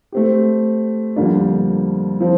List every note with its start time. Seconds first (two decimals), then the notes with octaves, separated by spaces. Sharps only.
0.12 A3 C4 G4
1.16 F2 D3 G3 A#3 D4
2.20 F3 C4